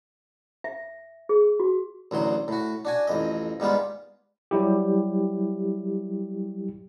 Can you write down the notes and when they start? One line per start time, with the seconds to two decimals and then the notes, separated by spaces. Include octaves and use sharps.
0.64 E5
1.29 G#4
1.60 F#4
2.11 A1 D2 F#3 C6
2.48 A2 F#4
2.85 D4 F#4 G#5
3.07 A1 F2 D#5
3.60 G#2 G3 B3 F4
4.51 F#3 G3 E4 G4